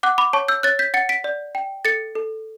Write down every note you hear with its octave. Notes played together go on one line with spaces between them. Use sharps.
F#5 D6 F#6
B5 D6
C#5 A5 C#6
E6 G6
C#5 F#6 A6
G6 B6
F#5 A6 C#7
B6 D7
D5
G5
A4 A6 C#7
A4